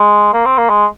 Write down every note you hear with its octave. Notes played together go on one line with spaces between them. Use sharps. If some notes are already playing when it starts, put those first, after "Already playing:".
Already playing: G#3
A#3
C4
A#3
G#3